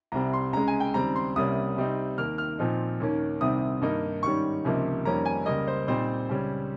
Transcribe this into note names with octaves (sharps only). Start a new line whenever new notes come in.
C2 C3 G3 C4 A#5
C6
C#2 C#3 G#3 A#5
G#5
G5
D#2 C#3 G3 C4 A#5
C6
C2 C3 G3 A#3 C#4 D#6
C3 G3 C4 D#4
D#2 D#3 A#3 F6
F6
A#2 F3 C4 D#4
D#2 D#3 A#3 C#4
C2 C3 D#3 G3 C4 D#6
G2 D#3 A#3 D#4
G#2 D#3 G3 C#4 C#6
C#2 C3 F3 A#3 D#4
F2 D#3 G3 A#3 C#4 A#5
G#5
C#2 C#3 G3 A#3 D#5
C5
A#2 G3 C4 D#4 C5
C#2 C#3 G3 C#4